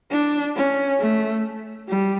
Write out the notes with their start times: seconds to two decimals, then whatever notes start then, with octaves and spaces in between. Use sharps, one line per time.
0.11 D4
0.56 C#4
1.00 A3
1.89 G3